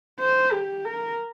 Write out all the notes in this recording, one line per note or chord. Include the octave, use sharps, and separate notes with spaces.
C5
G4
A#4